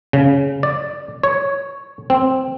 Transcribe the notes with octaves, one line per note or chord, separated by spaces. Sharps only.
C#3
D5
C#5
C4